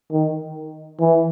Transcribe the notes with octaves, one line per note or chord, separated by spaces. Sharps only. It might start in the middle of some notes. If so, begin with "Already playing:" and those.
D#3
E3